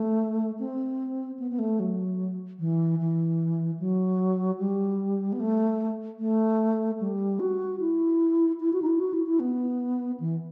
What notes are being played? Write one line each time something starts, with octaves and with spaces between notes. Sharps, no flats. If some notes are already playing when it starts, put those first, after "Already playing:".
Already playing: A3
C4
B3
B3
A3
F#3
E3
E3
F#3
G3
B3
A3
A3
G3
F#4
E4
E4
F#4
D#4
E4
F#4
E4
E4
B3
E3